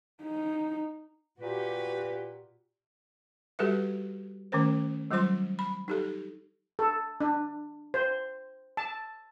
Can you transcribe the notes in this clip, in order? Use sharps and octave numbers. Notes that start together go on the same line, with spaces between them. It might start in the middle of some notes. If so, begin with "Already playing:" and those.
D#4
A#2 F#4 G4 B4
G3 F#4 G4 A4 B4 E5
D#3 A3 C#4 A#4 C5
F#3 G3 F4 C5 C6
B5
D#4 G4 A4
A4
D4
C5
A5